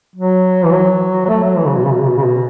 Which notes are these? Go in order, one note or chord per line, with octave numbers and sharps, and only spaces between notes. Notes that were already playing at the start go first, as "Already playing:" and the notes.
F#3
E3
F#3
F#3
A3
F#3
E3
C#3
B2
C#3
B2
C#3
B2
C#3
B2